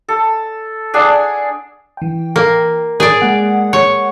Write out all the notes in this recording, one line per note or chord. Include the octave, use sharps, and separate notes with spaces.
A4
D4 G#4 F#5 G#5
E3 G5
A#3
G#4 A#4 D5
G#3 A#3 F#5
C#5